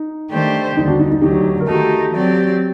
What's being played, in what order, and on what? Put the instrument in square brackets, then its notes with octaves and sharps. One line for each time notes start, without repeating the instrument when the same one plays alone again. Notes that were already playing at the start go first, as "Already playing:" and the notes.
Already playing: [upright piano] D#4
[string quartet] D#3 A3 D4 G4 C5
[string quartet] D#2 D3 G3 [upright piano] D#4
[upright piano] D4 F#4
D#4
D#4
[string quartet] D2 D3 F#3 [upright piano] D#4 G4
[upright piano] A#4
[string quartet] D#3 A3 D#4 G4 [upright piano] F#4 A4
[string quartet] F#3 C4 G4 D5